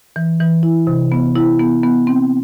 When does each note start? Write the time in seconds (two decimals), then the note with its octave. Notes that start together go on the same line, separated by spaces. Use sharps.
0.16 E3
0.40 E3
0.63 E4
0.87 C3
1.12 B3
1.36 E4
1.60 B3
1.83 B3
2.07 C4